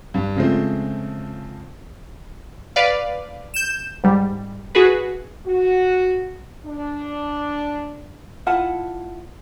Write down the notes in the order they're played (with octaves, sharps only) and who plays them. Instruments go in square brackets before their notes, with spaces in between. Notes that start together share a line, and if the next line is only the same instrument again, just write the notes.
[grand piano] G2
C#3 F3 G#3 A3 C4
[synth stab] B4 D5 F5
G6 E7
G#2 G3
F#4 G#4 B4
[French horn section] F#4
D4
[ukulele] E4 F4 F#5 A5